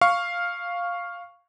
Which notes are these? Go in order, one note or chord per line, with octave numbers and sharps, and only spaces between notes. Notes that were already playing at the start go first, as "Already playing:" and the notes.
F5 C#6